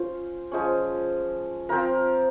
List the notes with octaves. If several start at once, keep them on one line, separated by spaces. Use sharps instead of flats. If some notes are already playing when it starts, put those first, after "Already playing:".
Already playing: C#4 F4 C5
F3 G#3 C#4
F3 C4 F4 A#4